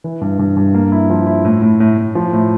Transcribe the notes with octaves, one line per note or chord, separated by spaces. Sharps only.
E3
G2
G2
G2
A#3
E4
F3
E4
A2
A2
A2
A2
F3
A2